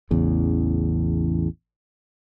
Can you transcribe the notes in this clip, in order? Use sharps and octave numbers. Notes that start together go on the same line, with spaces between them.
A1 E2 C#3